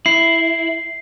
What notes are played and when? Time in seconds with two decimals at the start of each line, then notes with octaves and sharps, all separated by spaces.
0.06 E4 C7